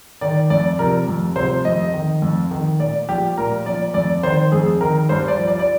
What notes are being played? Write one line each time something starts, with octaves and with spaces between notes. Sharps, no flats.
D#3 D5
F2 D5
C3 F3 A#4
F2
C3 F3 C5
F2 D#5
D#3
F2
D#3
A#2 D5
F3 G4
A#2 A#4
F3 D5
F2 D5
D#3 C5
F2 G#4
D#3 A#4
G2 C5
D5
F3
D5
D5